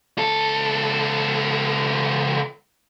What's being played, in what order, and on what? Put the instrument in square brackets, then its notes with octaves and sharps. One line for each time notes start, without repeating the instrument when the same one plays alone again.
[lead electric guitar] C#2 A4